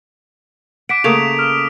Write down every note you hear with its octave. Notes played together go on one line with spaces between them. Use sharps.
F#5 D6 B6 D7
C#3 A3 A#3 D#6 D7 F7
F6